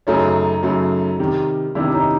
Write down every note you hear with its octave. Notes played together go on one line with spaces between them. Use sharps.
F#2 C#3 F#3 A3 C#4 D#4
F#2 C#3 F#3 A3
C3 D#3 G3
C3 D#3 G3 D4 E4
C#4 D#4